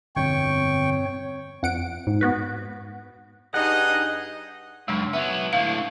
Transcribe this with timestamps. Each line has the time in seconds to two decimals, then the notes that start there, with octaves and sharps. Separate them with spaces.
0.16 G1 F2 B2 C4 C#5 G5 C#6
1.63 F2 F#5 D7
2.07 G#2
2.21 B3 F#4 B4
3.54 G2 D#4 G#4 D#5 F#5
4.88 C#2 F#2 G#3 D4
5.13 F#3 B3 E5
5.53 A2 D3 F5